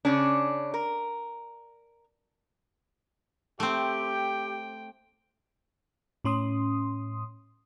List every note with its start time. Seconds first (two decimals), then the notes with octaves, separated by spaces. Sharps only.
0.05 C#3 C#4 D4
0.74 A#4
3.60 A3 C4 G4 G5
6.24 A2 C#4 C6 D#6